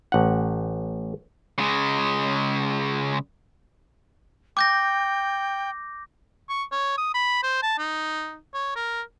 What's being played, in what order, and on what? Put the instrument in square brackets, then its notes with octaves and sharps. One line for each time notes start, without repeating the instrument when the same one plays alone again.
[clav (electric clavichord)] A1 F#5
[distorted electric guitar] C#3 G#3
[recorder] G5 [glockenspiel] D6 G6 A#6
[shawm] C#6
C#5
D#6
B5
C5
A5
D#4
C#5
A#4